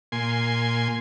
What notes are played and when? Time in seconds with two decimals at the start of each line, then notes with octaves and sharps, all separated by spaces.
0.12 A#2 G#5 C6